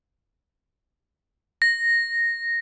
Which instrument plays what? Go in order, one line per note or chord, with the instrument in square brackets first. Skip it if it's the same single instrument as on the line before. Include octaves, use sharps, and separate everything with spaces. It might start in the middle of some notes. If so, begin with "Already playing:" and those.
[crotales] A#6